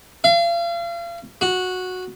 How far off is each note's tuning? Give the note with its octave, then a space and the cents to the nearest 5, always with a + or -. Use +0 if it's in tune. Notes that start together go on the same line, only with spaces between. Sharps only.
F5 -35
F#4 -10